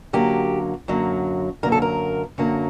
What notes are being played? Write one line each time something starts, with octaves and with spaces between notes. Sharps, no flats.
F#2 D3 F#3 A#3 G4
F#2 D3 F#3 A#3
F#2 D3 F#3 A#3 A#4
A4
A#4
F#2 D3 F#3 A#3